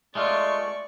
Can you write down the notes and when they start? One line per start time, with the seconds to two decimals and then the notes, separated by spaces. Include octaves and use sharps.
0.15 G#3 A3 F4 D5 C#6